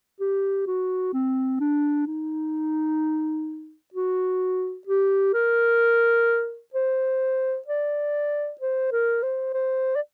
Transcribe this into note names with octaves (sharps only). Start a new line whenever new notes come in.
G4
F#4
C4
D4
D#4
F#4
G4
A#4
C5
D5
C5
A#4
C5
C5
D5